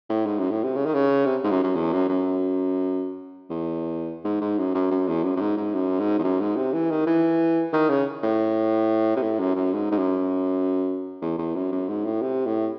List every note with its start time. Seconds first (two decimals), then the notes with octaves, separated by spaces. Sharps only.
0.10 A2
0.26 G#2
0.39 F#2
0.51 A2
0.64 C3
0.76 C#3
0.86 D#3
0.94 C#3
1.26 C3
1.44 G#2
1.51 F#2
1.64 F#2
1.75 E2
1.93 F#2
2.09 F#2
3.50 E2
4.25 G#2
4.41 G#2
4.58 F#2
4.74 F#2
4.91 F#2
5.08 E2
5.24 F#2
5.36 F#2
5.41 G#2
5.57 G#2
5.74 F#2
5.99 G#2
6.19 E2
6.24 F#2
6.41 G#2
6.57 C3
6.73 E3
6.91 D#3
7.07 E3
7.73 D#3
7.90 C#3
8.23 A2
9.16 C3
9.23 A2
9.39 F#2
9.56 F#2
9.73 G#2
9.92 G#2
9.98 F#2
11.22 E2
11.38 E2
11.55 F#2
11.72 F#2
11.88 G#2
12.05 A2
12.22 C3
12.46 A2